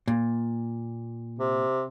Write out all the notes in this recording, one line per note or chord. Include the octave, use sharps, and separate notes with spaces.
A#2
C3